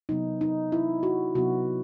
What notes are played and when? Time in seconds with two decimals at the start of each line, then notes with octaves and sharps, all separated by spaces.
0.09 C3 F#3 B3 D#4
0.41 D#4
0.72 E4
1.03 F#4
1.35 C3 F#3 B3 F#4